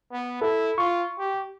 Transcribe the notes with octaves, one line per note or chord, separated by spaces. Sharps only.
B3
E4 A4
F4 C#6
G4